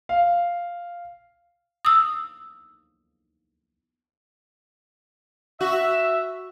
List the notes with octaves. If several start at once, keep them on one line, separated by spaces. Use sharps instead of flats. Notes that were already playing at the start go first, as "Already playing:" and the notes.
F5
D#6 E6
F#4 E5